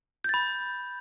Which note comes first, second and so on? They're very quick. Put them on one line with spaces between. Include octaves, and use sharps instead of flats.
G6 A6 B5